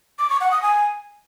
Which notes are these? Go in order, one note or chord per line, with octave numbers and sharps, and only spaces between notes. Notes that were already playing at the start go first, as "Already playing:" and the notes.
D6
C#6
F#5
D#6
G#5